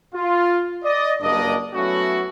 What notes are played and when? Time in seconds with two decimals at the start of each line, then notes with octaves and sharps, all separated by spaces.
0.15 F4
0.84 D5 D#5
1.22 F#1 G2 A#3 D4 D5 D#5
1.74 F#3 A3 B3 C#4 E4 F#4